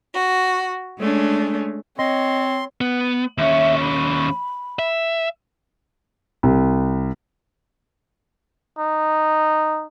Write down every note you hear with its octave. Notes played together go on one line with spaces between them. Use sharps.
F#4
G#3 A3 C#4 D4
C4 C#5 D#5 C6
B3
D#2 C#4 E5
B5
E5
C2
D#4